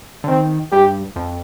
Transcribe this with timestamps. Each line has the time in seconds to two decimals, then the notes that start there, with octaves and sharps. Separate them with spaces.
0.24 D3
0.28 D#3 C4
0.72 G2 G4
1.16 F2